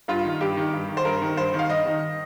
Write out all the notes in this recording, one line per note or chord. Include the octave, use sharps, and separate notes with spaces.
G2 F4
D#3
G2 G4
D#3
G2
D#3
C5
G2 A#4
D#3
G2 C5
D#3
F5
G2 D#5
D#3